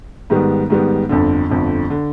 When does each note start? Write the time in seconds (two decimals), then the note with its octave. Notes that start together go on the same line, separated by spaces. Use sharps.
0.30 G#2 D#3 G3 B3
0.70 G#2 D#3 G3 B3
1.09 G1 F2 D3
1.50 G1 F2 D3
1.90 D3